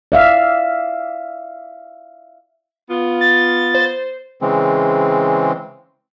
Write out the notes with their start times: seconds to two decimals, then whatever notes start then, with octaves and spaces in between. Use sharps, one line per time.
0.12 D5 E5 F5
2.90 B3 F4
3.21 A6
3.75 C5
4.42 C#3 E3 G#3 C4